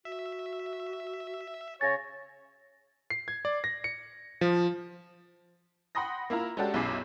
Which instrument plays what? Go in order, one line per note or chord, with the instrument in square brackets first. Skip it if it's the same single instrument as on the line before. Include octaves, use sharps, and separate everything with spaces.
[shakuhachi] F#4 [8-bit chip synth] E5
[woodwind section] C#3 C#5 [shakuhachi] G#5 [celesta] A6 A#6
[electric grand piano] C7
G#6
D5
A#6
C#7
F3
[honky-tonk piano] F#5 G5 B5 C6 D#6 A#6
A#3 E4 F4 A#5
G#3 C#4 D4 F#4 G4 A4
B1 F#2 E4 G#4 D6 C7